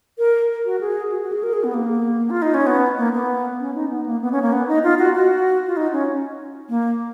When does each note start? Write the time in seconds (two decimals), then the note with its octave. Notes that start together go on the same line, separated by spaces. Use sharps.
0.19 A#4
0.65 F#4
0.80 G#4
1.12 F#4
1.22 F#4
1.32 G#4
1.43 A#4
1.53 G#4
1.64 B3
1.74 A#3
2.30 F4
2.42 D#4
2.54 C#4
2.67 B3
2.97 A#3
3.14 B3
3.60 C#4
3.74 D#4
3.90 B3
4.06 A#3
4.21 B3
4.32 C#4
4.42 A#3
4.53 B3
4.68 D#4
4.83 F4
4.99 F#4
5.15 F#4
5.67 F4
5.77 D#4
5.92 C#4
6.69 A#3